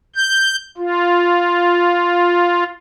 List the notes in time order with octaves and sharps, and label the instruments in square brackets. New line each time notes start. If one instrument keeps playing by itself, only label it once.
[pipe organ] G6
F4